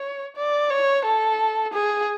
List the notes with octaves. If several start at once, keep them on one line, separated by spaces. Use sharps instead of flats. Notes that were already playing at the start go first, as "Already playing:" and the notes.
Already playing: C#5
D5
C#5
A4
G#4